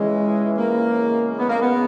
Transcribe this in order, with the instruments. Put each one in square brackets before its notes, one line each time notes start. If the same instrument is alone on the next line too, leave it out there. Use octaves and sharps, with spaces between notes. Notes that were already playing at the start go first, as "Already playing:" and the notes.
Already playing: [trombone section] C#2 C#3 E3 [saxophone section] G#3
[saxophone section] A#3
[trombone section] E2 C#3 G#3
[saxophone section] B3
A#3
B3